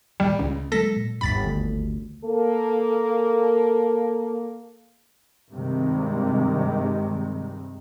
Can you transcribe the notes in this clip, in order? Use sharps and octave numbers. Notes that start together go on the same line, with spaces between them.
D#1 A1 D#2 G3
C#2 C#3
F#3 G#3 A#3 A4 A#6 B6
A#2
G1 D#2 B5 A6 B6
D2
A#3 A4
G2 C3 D#3 G3 G#3